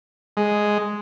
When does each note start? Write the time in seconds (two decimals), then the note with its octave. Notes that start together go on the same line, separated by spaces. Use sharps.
0.37 G#3